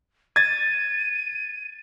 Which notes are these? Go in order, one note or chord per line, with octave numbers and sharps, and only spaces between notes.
G#6 A6 D#7